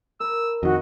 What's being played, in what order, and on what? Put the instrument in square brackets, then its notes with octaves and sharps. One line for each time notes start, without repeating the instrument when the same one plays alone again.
[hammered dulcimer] A#4 A5 B5 [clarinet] E6
[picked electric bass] F2 D#3 [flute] F#4 [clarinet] D#5